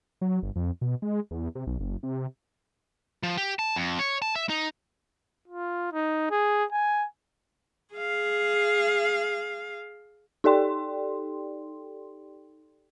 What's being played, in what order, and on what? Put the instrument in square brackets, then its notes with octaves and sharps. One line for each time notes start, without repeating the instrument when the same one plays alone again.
[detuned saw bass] F#3
G1
F2
B2
G#3
E2
C3
B1
F#1
C3
[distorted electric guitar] F3
G4
A5
F2
C#5
A5
E5
D#4
[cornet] F4
D#4
G#4
G#5
[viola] G#4 F5
[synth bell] D#4 G4 A4 D5 G5 C6